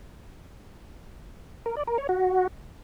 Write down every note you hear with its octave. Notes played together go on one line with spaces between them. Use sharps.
A#4
D5
A#4
C#5
F#4